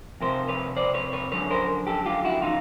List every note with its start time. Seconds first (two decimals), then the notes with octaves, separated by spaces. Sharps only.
0.21 F2 C3 F3 A#4 C5
0.48 B4 C#5
0.77 C5 D5
0.94 B4 C#5
1.13 B4 C#5
1.32 F#2 D3 F3 B4 C#5
1.51 A#4 C5
1.87 G4 A4
2.06 F4 G4
2.25 E4 F#4
2.42 C#3 E3 D#4 F4